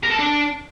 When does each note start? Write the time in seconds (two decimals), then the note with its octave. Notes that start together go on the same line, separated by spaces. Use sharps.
0.03 A#4
0.11 A4
0.19 D4